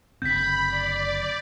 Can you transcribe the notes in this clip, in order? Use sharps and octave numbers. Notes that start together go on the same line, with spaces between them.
F#1 D3 C4 B5 G6 B6
D5